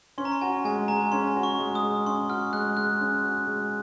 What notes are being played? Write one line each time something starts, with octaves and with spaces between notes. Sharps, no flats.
C#4 C6
A#5
C6
F#4 G#5
G#3 G#5
G#3 A#5
C#4 C6
F#4
C#6
G#3
D#6
G#3
C#4 C6
F#4 F6
G#3 F#6
G#3 F#6
C#4
F#4
G#3